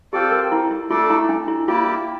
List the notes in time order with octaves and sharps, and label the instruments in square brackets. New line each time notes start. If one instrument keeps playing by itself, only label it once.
[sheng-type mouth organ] C4 F4 A4 D5 [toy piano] G4
[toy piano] A#4
E4
E4
[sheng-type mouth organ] A3 D4 A4 D5 [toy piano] F4
[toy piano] E4
D4
E4
[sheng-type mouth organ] A#3 E4 G4 D5 [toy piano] F4